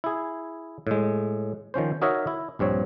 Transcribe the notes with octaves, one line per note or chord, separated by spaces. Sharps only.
E4 G#4
A2 G#3
D#3 F3 C#4 C5
D#4 F#4 A#4 C#5 D#5 E5
E4
A#1 G2 C4 C#5